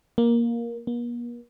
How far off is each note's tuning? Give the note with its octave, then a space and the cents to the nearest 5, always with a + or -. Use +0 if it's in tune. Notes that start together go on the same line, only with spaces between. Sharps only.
A#3 +10
A#3 +45